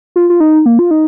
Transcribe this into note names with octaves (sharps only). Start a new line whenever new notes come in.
F4
F4
D#4
A#3
F4
D#4